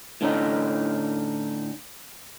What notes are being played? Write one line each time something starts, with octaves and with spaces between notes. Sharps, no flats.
A2 D3 C#4 D#4